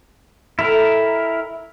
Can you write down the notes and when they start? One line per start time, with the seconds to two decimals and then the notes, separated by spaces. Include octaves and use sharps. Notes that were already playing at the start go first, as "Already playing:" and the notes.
0.59 E4 A4 A#4 D#5 G5